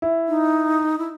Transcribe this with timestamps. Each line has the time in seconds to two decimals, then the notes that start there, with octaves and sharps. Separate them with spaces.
0.02 E4
0.28 D#4
0.98 E4